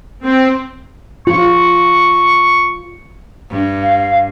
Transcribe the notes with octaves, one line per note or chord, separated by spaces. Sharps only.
C4
F4 C#6
G2
F5